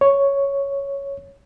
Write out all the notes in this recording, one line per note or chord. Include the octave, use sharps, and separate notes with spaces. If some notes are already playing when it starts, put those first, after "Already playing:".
C#5